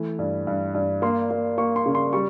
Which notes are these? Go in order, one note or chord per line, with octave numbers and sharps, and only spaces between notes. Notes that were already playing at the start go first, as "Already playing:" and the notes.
Already playing: E3 A3
G2
G2
G2
A#3 C6
A#3
A#3 C#6
C6
C#3
C6
G3 C#6